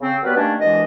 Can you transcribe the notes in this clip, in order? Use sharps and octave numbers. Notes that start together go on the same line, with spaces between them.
C#3 C4
F#3 G3 B3 A#4 B4
D#3 G3 A3 A#3 C#4 D4
C2 B2 E3 G#3 D4 D#5